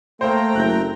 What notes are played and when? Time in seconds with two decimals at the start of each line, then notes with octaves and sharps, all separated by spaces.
0.21 A3 A#3 C4 C5 G5 A#5
0.56 F#1 F#6 G6